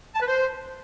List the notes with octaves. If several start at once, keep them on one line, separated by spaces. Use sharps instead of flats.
A5
B4
C5